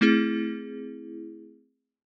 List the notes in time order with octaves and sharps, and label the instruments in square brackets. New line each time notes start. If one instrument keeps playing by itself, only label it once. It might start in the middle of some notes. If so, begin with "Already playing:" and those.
[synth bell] A3 C4 E4 G#4